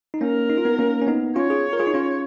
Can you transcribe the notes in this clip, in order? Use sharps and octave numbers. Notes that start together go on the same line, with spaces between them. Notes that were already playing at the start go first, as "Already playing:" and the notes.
D#4
A#3 C#4 A#4
D#4
F4
B3 D#4
A#3 C#4
C#4
B3 D#4
C#4 F4 C#5
F4 G#4
A#4
F4 G#4
D#4
C#4 F4